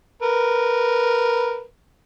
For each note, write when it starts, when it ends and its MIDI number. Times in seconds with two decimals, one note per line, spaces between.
0.22 1.63 70
0.22 1.63 71